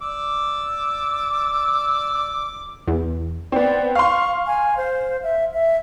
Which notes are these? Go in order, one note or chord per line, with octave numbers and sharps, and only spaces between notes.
D5 D6 E6
E2
B3 C4 D5
F5 C6 C#6
G#5
C5
E5
E5